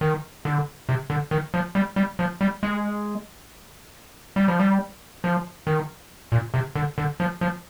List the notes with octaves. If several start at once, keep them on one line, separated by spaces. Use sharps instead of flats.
D#3
D3
C3
D3
D#3
F3
G3
G3
F3
G3
G#3
G3
F3
G3
F3
D#3
A#2
C3
D3
D3
F3
F3